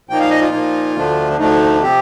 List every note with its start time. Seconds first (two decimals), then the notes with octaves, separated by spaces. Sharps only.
0.09 A#2 F3 A#3 D#4 G5
0.20 F5
0.30 D#5
0.41 F4
0.52 A#2 F3 A#3 D#4
0.96 D2 D3 F3 A3 D4
1.38 D2 D3 F3 A3 D4 D#4
1.82 C3 F3 C4 G4